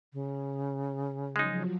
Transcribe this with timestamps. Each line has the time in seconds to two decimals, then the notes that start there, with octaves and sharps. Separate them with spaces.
0.13 C#3
1.36 F3 F#3 G#3 D#4